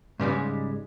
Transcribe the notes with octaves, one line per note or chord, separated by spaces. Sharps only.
G#2 C#3 G3 G#3